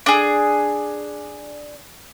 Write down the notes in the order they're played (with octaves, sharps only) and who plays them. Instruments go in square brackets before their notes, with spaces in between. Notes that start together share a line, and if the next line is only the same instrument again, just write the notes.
[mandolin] D4 G#4